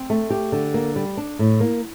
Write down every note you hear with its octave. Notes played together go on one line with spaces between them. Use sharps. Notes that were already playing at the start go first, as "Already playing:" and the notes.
Already playing: C4
A3
G4
D3
A#3
G3
D4
A2
A#3